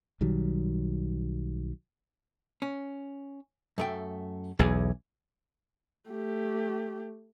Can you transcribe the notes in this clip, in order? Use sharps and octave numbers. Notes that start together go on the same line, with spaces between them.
B1 D#3 F#3 G3
C#4
F#2 A3 G5
B1 E2 E3 G#4
A3 G4